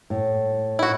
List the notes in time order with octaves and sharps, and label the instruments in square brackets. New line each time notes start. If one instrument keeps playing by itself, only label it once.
[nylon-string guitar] A2
[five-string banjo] E4 F#4